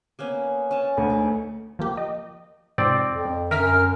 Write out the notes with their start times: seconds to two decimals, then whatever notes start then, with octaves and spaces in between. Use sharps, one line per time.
0.19 A#3 B3 C#4
0.71 C#4 A5
0.97 D2 G#4
1.10 D#4
1.79 F3 A#3 G4
1.97 D#5
2.78 G#2 C3 F3 C4 D5
3.09 F2
3.51 F#2 D3 A#4 E5 F6 B6